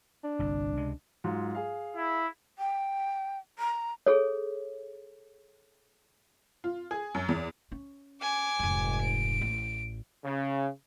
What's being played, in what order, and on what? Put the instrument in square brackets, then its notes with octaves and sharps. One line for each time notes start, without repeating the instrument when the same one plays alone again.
[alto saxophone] D4
[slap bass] G1 C2
C#2 C3 G#3
[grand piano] G#2 F#3 F4
G#4 F5
[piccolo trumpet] E4
[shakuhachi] G5
A#5
[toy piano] G#4 A4 C#5
[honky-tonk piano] F4
G#4
F#2
E2
[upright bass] C#4
[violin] G#5 D6
[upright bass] F1 G#2
[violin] D7
[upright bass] A1
[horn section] C#3